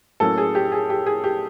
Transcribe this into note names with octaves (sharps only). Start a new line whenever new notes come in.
A2 F#3 A#3 C#4 A4
G#4
G4
G#4
G4
G#4
G4